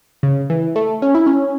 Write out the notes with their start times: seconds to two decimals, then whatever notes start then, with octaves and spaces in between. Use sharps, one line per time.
0.23 C#3
0.50 E3
0.76 A3
1.02 C#4
1.15 E4
1.26 C#4